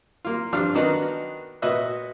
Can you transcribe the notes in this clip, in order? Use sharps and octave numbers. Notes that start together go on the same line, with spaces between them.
A#3 F4
G2 F3 D4 F5 F6
D#3 B3 D4 D#4 F#4
A#2 F#4 B4 D#5 E5 F#6